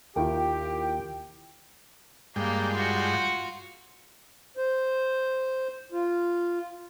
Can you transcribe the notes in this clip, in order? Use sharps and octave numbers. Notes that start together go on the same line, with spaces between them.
D#2 E4 F4 G4 A#4 G5
G2 G#3 A#3 G5
F4 F#4
C5
F4